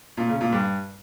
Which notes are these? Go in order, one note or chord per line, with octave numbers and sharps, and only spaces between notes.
A#2
C#3
A#2
G2